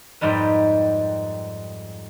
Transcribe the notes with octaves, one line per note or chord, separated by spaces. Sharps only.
F2 G#2 G3 D#4 B4